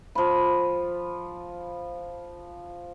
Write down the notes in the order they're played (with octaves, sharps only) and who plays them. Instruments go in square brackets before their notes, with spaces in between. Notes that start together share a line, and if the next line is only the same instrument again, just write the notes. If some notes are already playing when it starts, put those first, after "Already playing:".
[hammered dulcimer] F3 B5